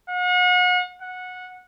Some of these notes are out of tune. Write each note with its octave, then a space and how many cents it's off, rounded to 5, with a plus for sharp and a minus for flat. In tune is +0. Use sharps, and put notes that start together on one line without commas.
F#5 -40
F#5 -15